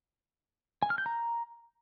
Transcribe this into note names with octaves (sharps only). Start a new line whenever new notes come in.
G#5
F6
G6
A#5